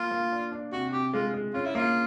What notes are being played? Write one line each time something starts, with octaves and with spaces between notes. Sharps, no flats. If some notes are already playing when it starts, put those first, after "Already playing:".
Already playing: A#3 F4
A#3
D4
D4
C3 F#4
C3 G4
G#3 F4
G#3
C#4 F4
E4
A#3 F4